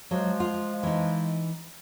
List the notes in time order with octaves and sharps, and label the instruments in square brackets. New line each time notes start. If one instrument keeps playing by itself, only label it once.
[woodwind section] F3 G#3 [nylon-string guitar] F#3
[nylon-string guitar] F4
E3 D#4